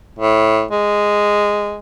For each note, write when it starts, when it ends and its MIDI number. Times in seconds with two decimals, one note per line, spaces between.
0.19 0.64 45
0.71 1.79 56